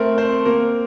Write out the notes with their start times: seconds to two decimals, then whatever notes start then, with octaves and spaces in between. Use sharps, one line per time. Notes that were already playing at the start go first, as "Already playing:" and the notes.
Already playing: A3 C4 A#4
0.18 C4 C5
0.45 A#3 A#4